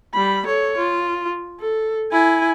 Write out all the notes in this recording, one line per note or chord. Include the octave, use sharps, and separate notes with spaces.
G3 B5
A4 C#5
F4
A4
E4 G#5